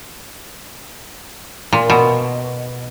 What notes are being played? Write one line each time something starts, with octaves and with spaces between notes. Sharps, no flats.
A#2
B2